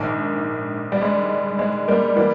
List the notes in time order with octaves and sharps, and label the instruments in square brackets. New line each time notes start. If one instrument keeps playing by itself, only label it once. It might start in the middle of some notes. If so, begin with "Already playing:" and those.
Already playing: [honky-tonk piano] A#1 G#2 D#3
G3
G#3
G#3
G3 A#3
E3 G3 A#3